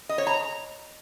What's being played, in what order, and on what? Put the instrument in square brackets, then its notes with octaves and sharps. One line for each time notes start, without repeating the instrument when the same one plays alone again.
[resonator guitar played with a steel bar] D#5
C#5
A#5